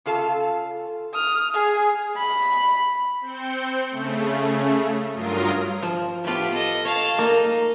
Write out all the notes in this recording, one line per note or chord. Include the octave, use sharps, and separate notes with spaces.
C#3 F4 A4 F5 A5
D#6 F6
G#4
B5
C4 G6 C#7
C#3 A3
G2 F#3 F4 A#4 C6 D#6
F3
A2 B3 F4 G4
A4 D#5
C#5 F5 A5
A#3 D#4